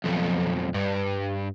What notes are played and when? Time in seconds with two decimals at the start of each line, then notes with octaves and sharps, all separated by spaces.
0.04 B1 F2
0.74 G2